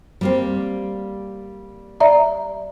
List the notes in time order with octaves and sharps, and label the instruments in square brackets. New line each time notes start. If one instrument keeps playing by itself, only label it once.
[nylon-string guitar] G3 A#3 C4
[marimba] D5 E5 A#5